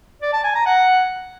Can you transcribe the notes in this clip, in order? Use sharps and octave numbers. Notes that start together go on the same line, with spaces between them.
D5
A5
G#5
A#5
F#5